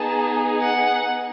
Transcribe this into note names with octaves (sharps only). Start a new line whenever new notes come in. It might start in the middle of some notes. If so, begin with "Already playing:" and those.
Already playing: B3 D#4 G#4 A5
F#5